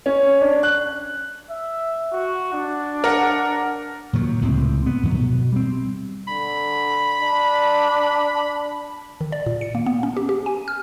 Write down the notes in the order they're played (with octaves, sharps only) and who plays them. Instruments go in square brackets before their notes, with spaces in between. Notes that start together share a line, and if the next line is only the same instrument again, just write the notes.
[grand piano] C#4
D4
F#6
[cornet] E5
F#4
D4
[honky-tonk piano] A#4 F#5
[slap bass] A#2 D#3 F#3
C#2 A2 C3 C4
B3
G2 D#3 E3 F#3
B2
G3 C4
[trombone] D3 [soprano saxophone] B5
[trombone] D4
[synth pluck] D#3
D5
A#2
C#7
A#3
B3
C#4
G4
G4
G#5
F6